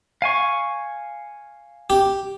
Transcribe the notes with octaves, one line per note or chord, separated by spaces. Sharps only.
F5 G#5 C#6
G4